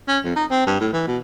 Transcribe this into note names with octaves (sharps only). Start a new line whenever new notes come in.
C#4
F2
D#4
C4
G2
A2
E3
B2